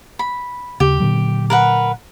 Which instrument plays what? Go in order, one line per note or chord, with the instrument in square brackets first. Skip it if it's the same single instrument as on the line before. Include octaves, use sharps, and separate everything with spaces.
[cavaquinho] B5
[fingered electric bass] D#2 C#3 [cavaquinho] G4
[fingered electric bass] A#2 D3 F#3
[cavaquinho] A#4 B4 F#5